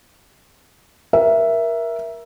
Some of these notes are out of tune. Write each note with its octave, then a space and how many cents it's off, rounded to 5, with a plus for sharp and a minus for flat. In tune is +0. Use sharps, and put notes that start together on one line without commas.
A#4 +20 E5 +5